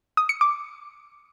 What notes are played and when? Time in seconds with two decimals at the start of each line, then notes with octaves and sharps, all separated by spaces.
0.17 D#6
0.29 C#7
0.41 D6